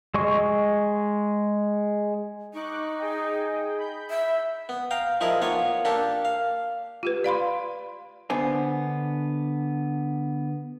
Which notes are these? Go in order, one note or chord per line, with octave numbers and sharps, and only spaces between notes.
G#3 D#5 C#6
D#4 C#6 D6 F#6
G#4 D#5 G5
B5 G6
E5
B3
F5 G5 A#5
F3 D#4 E4 G#4 A#4
A#3 B3 F4 C#5
A#3 D4 G4 A4
F5
F4 G4 B4
D5 F5 B5 C6
D3 B3 D4 C5 G#5